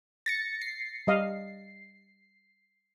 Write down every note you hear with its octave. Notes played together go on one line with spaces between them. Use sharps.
A6 A#6 C#7
C7
G3 D#5 F5